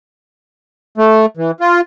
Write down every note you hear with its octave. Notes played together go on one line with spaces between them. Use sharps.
A3
E3
F4